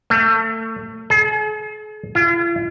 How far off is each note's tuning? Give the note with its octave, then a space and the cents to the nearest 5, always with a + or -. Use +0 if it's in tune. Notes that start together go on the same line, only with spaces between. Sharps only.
A3 +30
G#4 +45
F4 -45